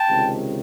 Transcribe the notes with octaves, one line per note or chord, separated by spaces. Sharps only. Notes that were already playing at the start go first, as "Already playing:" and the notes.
Already playing: G5 A5
C#2 C3 D#3